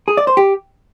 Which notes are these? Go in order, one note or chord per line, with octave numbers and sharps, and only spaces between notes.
G#4
D5
C5
G4